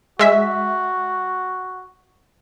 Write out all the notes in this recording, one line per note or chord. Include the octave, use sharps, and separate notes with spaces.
G#3 F#4 E5 B6